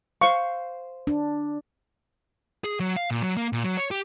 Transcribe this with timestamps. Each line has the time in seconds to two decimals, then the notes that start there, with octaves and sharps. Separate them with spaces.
0.21 C5 F5 C#6
1.07 D4
2.64 G#4
2.80 F#3
2.96 F5
3.11 A#2
3.22 F#3
3.37 A#3
3.53 A#2
3.64 F#3
3.77 C#5
3.91 G4